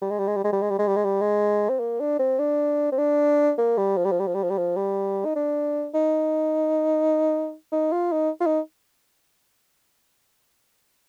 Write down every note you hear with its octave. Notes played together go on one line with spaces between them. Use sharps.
G3
G#3
G3
G#3
G3
G#3
G3
G#3
G3
G#3
G3
G#3
G3
G#3
C4
A#3
D4
C4
D4
C4
D4
A#3
G3
F3
G3
F3
G3
F3
G3
F3
G3
F3
G3
D#4
D4
D#4
D#4
F4
D#4
F4
D#4